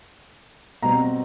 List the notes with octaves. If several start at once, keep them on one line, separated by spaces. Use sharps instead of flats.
B2 G3 C4 A#5